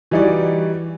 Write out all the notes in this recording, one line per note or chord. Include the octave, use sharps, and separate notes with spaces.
E3 G3 D#4 F#4 D5